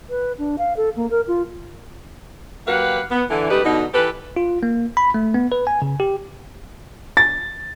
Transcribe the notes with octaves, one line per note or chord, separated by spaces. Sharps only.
B4
D4
F5
A4
A#3
A#4
F4
F#3 A#3 G4 B4 F5 F#5
B3
D3 E3
F#2 G3 A3 D#4 G4 B4
B2 D3 D#4
E3 G4 A4 B4
F4
A#3
B5
A3
B3
B4
G#5
C#3
G4
A6